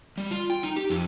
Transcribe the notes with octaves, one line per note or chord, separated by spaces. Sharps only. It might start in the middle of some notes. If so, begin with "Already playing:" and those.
G3
F4
G5
D#4
G4
F2